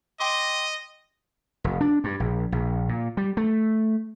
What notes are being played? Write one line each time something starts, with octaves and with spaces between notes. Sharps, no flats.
D#5 G5 C6 D6
F1
D4
G2
A#1
A#1
A#2
G3
A3